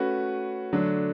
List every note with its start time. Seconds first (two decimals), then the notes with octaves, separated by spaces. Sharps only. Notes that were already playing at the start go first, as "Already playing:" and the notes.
Already playing: A3 C#4 F#4 B4
0.73 D3 F#3 A3 D4